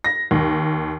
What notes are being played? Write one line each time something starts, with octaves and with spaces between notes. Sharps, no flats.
A#6
D#2